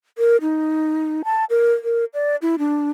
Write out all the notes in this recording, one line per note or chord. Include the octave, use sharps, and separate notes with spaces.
A#4
D#4
A5
A#4
A#4
D5
E4
D4